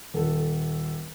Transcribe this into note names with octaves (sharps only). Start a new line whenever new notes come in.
D#1 A4